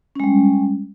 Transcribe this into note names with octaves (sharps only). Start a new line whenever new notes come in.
G3 G#3 C#4